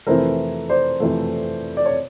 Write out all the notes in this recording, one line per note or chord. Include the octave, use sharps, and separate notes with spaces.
F2 C3 E3 A3 A#4 C5
C5 D5
F2 C3 E3 A3
D5
C#5